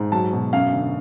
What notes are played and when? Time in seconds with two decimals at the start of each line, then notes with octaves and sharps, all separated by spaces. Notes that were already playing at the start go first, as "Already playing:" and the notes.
Already playing: G#2
0.12 F#3 A5
0.33 B2
0.53 F#2 F5
0.73 D3